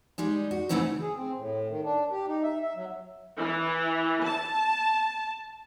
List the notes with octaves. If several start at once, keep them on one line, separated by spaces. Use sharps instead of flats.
G3 G#3 D#4
F#4
C#3 E3 F#3 A3 C4 D#4
G#4
C4
A2
D#3
D4
G4
D#4
E5
E5
F#3
E3
A5